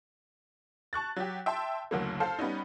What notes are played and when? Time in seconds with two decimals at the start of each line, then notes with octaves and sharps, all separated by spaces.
0.93 A5 C#6 F#6 A6
1.16 F#3 G4
1.46 E5 G5 A5 C6
1.91 F#1 D2 F#3 A#3
2.20 A4 C5 F5 A5
2.39 G3 B3 C#4 D#4